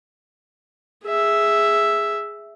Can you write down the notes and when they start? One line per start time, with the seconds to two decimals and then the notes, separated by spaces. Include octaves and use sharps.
1.05 G#4 E5